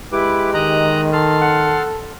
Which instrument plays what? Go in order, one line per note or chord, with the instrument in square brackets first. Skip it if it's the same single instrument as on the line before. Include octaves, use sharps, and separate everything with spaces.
[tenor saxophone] G#3 [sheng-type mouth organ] E4 B4 D6 [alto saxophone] G4
[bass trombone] D#3 [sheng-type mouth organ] D#5 A#5 F#6
[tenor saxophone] A4 [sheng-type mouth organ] A5 C6 F6
[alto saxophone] F#5